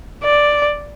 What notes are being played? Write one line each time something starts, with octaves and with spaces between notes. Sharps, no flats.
D5